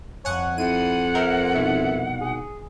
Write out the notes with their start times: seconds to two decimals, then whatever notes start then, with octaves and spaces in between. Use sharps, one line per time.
0.25 F2 C#5 F#5 G#5
0.58 F2 E4 F#5 D#7
1.15 A#4 C5 E5
1.55 C2 B2 D#3 E5
2.21 G#4